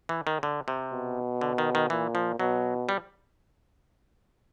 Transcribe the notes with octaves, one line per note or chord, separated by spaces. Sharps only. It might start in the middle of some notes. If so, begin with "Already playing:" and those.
E3
D#3
D3
C3
B2
D3
D#3
D#3
A#2 E3
F3
B2 F#3
G3